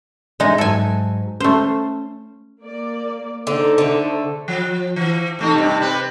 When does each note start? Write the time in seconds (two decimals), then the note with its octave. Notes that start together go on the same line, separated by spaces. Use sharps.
0.40 G#3 D#4 E5
0.58 G#2 F#3 A4 G#5
1.40 A3 C#4 C5
2.61 A#3 D5
3.47 D3 D#4 A4 C5
3.78 D3 A3
4.48 F3
4.96 E3
5.39 C3 A3 D#4
5.54 G2 C3
5.80 C3 C4 B4